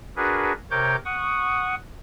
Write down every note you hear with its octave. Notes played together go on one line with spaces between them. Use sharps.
D4 F#4 G#4 A#4 B4
C3 A#4 C#5 D6 G6
F#5 C#6 D#6